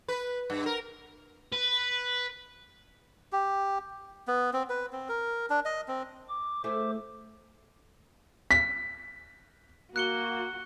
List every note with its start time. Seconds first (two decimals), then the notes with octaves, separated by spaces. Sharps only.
0.08 B4
0.50 G2
0.66 A#4
1.53 B4
3.33 G4
4.28 B3
4.53 C4
4.69 B4
4.93 C4
5.09 A#4
5.50 D4
5.65 D#5
5.88 C4
6.29 D6
6.64 A3 E4 G#4 C5 D6
8.51 B6
9.96 A#3 F#4 F#6 C#7 G7